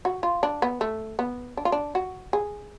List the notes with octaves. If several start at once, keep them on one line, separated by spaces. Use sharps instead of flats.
F#4
F4
D4
B3
A3
B3
D4
F4
D4
F#4
G#4